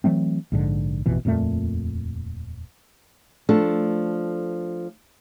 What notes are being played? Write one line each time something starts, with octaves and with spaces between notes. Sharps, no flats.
E3 F#3 A3 C4
A#1 G#2 D3
A1 F2 B2 E3
D#1 F2 A#2 A3
F3 A3 D4 A4